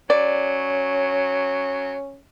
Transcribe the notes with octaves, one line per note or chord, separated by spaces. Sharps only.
F#3 C#4 D5